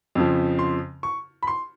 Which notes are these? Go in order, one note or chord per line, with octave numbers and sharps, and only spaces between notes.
F2 C#3 F3
C6
C#6
B5
C6